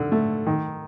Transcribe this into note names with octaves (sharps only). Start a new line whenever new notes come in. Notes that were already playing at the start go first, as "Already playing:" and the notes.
Already playing: D3
A3
D#3